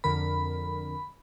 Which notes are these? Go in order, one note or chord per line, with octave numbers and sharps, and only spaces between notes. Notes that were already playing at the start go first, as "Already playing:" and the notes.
F2 D3 A#4 B5